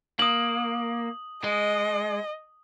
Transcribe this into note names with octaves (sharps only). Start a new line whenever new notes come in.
A#3 D#6 F#7
G#3 D#5